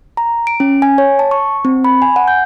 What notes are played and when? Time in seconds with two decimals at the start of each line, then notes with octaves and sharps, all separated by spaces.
0.17 A#5
0.47 D7
0.60 C#4
0.82 G#5
0.98 C#5
1.19 A5
1.31 C#6
1.65 C4
1.85 B5
2.02 G#5
2.16 F#5
2.28 G6